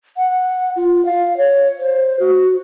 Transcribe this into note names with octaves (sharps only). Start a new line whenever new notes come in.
F#5
F4
F5
C#5
C5
F#4